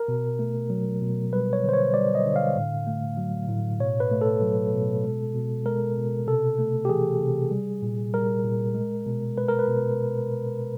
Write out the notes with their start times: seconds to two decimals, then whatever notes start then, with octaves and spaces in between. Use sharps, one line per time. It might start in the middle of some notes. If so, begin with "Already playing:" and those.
Already playing: A#4
0.08 B2
0.39 A3
0.70 F#3
1.01 B2
1.33 G3 B4
1.53 C#5
1.64 D3 C5
1.73 C#5
1.94 G3 D5
2.15 D#5
2.26 D3
2.36 F5
2.56 A2
2.87 A3
3.17 F#3
3.49 A2
3.80 B2 C#5
4.00 B4
4.11 A3
4.21 A4
4.42 F#3
4.73 B2
5.04 G#3
5.34 B2
5.65 G#3 A#4
5.97 B2
6.27 C3 A4
6.58 A3
6.85 G4
6.89 E3 G#4
7.20 C3
7.51 G3
7.82 A#2
8.14 G3 A#4
8.44 A#2
8.75 G#3
9.06 B2
9.38 G#3 B4
9.49 A#4
9.59 B4
9.67 B2